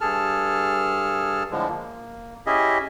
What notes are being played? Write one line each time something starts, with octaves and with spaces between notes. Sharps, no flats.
G2 G#4 A4 A5 F6
A2 D3 F3 G#3
A#3
C#4 E4 G4 G#4 D#5 E5